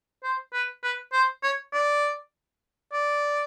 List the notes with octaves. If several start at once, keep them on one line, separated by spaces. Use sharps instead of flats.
C5
B4
B4
C5
C#5
D5
D5